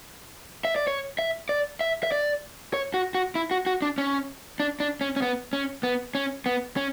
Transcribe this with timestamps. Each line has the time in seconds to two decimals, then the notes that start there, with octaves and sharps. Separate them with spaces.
0.65 E5
0.76 D5
0.87 C#5
1.19 E5
1.49 D5
1.81 E5
2.03 E5
2.12 D5
2.74 C#5
2.94 F#4
3.15 F#4
3.35 E4
3.51 F#4
3.66 F#4
3.82 D4
3.98 C#4
4.60 D4
4.80 D4
5.01 C#4
5.16 C#4
5.22 B3
5.53 C#4
5.83 B3
6.15 C#4
6.46 B3
6.77 C#4